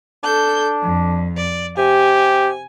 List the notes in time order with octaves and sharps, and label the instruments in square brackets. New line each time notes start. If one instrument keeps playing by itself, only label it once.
[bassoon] D4 [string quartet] A4 G6
[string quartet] F2
D5
[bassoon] C3 [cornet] G4 [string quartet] G#5